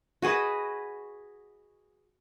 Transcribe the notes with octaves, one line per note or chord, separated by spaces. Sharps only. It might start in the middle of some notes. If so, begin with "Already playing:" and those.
F#4 G#4 B4 D#5